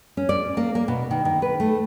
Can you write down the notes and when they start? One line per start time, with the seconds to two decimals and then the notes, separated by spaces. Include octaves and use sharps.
0.17 C#4
0.29 D5
0.57 A#3
0.75 A#3
0.88 B2
1.11 D#3
1.25 D#3
1.42 B4
1.60 A3